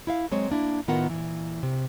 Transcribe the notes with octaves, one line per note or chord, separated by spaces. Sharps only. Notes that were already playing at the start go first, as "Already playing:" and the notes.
E4 E5 F5
F#3 G#3 C4 C5 C#5
A#3 D4 E4
A2 D#3 B3 F4 A#4 F#5
A#2 E3
C3